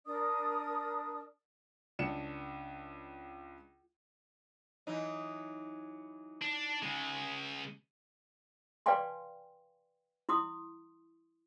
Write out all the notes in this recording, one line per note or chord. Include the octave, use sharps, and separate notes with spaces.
D4 A#4 D5 D#6
C#2 D4 C#7 E7
E3 F#3 D#4
D4
C#3 G#3
B4 D5 F5 G5 G#5 C6
E4 C6 D#6